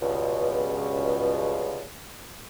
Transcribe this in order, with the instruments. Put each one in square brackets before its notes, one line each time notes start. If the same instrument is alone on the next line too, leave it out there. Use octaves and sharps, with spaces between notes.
[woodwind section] C#2 G2 B2